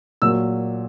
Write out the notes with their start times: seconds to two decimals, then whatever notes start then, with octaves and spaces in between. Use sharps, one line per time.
0.22 A#2 F#3 E6